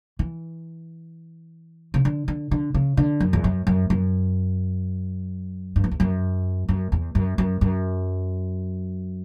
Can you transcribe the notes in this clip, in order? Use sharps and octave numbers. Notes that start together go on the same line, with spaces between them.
E3
C#3
D3
D3
D3
C#3
D3
F#2
E2
F#2
F#2
F#2
G2
F#2
E2
F#2
F#2
E2
F#2
F#2
F#2